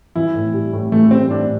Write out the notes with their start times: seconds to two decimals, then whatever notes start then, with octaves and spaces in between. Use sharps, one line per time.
0.16 E3 E4
0.35 A2
0.54 G3
0.73 A2
0.92 E3 A3
1.11 G3 C4
1.30 A2 D4